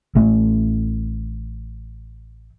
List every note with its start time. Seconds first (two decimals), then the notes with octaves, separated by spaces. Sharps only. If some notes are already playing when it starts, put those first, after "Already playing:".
0.15 A1 A2 A3